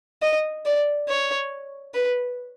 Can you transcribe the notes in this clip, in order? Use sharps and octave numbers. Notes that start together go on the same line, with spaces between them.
D#5
D5
C#5
B4